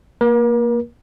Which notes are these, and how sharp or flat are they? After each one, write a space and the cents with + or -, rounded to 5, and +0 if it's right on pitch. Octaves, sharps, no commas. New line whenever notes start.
A#3 +0 A#4 +40